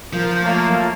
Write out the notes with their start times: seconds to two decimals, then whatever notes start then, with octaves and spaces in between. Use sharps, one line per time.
0.13 F3 A#4 G6
0.42 A3 A#3 F4 C#5 A5